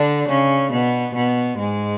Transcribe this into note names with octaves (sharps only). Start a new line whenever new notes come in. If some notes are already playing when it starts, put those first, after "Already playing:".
Already playing: D3 D4
C#3 C#4
B2 B3
B2 B3
G#2 G#3